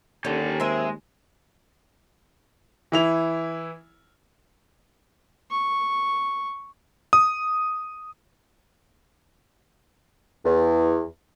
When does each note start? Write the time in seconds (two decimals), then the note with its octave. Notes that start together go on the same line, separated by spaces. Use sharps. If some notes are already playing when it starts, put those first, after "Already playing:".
0.25 D#2 D3 C#4 G4 A4
0.60 G#3 C4 A#4 E5
2.92 E3 E4 F7
5.51 C#6
7.13 D#6
10.45 E2